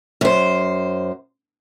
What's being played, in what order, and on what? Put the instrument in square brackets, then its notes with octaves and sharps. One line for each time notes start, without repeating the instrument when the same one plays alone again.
[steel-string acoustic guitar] F#2 C5